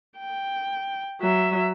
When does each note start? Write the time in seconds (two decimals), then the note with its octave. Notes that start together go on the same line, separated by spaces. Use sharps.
0.19 G5
1.21 F#3 E5